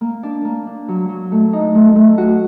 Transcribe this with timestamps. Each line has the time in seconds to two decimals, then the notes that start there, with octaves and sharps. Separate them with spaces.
0.01 A#3
0.23 D4
0.45 A#3
0.67 D4
0.88 F#3
1.09 F#3
1.32 A3
1.53 D#4
1.75 A3
1.96 A3
2.18 F#4